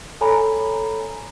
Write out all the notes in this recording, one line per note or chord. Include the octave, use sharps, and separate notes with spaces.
A4 C#5 G#5 A#5 B5